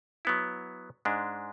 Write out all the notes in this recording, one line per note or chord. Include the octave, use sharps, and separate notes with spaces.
F#3 B3 E4
G#2 G#3 D4